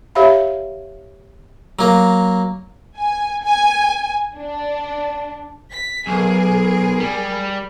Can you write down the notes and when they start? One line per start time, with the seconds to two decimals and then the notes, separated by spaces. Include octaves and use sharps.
0.15 G4 C#5 E5 F5 B5
1.79 F#3 A#3
2.97 G#5
3.44 G#5
4.37 D4
5.71 B6
6.07 B1 G#4 A#4
7.00 G3